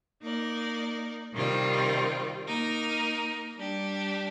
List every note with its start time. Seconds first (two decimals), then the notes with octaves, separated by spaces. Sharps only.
0.22 A#3 D#4 A#4 D5
1.33 C3 D#3 G3 C4 F4
2.45 A#3 D#4 A#4
3.55 G3 D4 G4